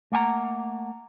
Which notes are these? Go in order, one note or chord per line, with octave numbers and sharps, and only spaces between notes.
A3 A#3 F#5 G#5 A#5